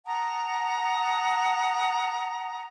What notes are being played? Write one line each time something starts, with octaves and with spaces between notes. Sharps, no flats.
F#5 A5 A#5 D#6